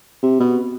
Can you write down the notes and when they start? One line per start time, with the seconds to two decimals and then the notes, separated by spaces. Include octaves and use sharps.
0.23 C3
0.40 B2